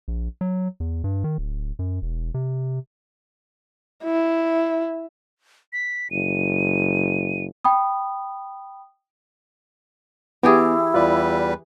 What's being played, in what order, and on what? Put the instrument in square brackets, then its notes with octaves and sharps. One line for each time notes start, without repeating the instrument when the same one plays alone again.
[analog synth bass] A#1
F#3
E2
G2
D#3
D1
F#2
E1
C3
[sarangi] E4
[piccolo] B6
[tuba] F#1 [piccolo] D#7
[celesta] G5 B5 D#6
[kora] E3 G4 G#4 [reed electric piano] B3 [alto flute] E4
[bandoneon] E2 G3 B4 [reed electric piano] F4 D5